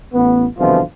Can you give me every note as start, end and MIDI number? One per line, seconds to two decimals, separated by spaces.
0.14 0.46 33
0.14 0.46 59
0.59 0.81 36
0.59 0.81 47
0.59 0.81 50
0.59 0.81 52
0.59 0.81 53
0.59 0.81 65